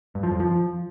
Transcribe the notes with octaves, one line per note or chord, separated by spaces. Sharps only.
G2
F3
F2
F3